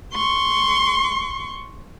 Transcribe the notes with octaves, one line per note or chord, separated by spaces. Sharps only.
C6 C#6